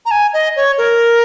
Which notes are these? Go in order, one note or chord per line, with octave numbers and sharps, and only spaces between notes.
A#5
G#5
D#5
C#5
A#4